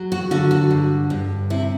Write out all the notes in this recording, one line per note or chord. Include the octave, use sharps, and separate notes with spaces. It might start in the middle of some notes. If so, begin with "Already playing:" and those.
Already playing: F#3
F#4
D3 F#4
F#4
G2
G2
C3 E4